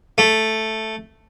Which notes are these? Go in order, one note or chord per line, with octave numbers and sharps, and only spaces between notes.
A3